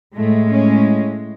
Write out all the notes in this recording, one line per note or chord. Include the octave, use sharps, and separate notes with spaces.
A2 G#3 A3
C#4